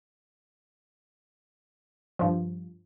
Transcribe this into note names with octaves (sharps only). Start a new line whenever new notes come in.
G2 F3